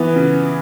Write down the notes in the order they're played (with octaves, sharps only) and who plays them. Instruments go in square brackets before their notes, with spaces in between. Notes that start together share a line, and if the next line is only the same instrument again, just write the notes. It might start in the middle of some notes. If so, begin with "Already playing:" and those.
Already playing: [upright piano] E3 B3
C#3